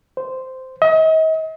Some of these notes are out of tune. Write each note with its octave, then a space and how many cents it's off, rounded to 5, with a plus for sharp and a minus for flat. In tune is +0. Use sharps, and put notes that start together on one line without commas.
C5 -10
D#5 +40